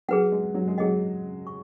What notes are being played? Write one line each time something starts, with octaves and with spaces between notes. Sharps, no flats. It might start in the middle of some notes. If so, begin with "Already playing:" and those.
F#3 G#4 B4 F#5
G#3
F#3
G#3
F#3 G#4 D#5 F#5
C#6